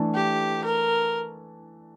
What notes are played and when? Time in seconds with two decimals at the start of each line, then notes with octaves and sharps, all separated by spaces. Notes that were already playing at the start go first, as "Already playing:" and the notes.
Already playing: E3 A3 D4 A4
0.15 G4
0.64 A#4